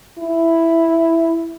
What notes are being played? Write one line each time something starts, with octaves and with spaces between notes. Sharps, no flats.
E4